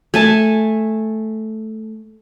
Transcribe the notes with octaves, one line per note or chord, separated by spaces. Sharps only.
A3 G#5 A5